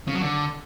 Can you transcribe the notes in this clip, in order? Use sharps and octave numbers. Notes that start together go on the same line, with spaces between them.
C#3
F#3
D3